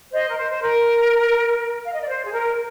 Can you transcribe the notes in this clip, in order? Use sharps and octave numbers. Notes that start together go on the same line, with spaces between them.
C5 D#5
A#4
C5
C5
A#4
F5
D#5
D5
C5
G#4
A#4